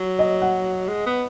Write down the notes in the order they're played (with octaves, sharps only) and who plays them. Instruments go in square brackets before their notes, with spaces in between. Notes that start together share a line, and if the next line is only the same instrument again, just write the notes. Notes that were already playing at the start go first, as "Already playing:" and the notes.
Already playing: [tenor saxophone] F#3
[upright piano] D#5
F#5
[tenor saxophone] G#3
B3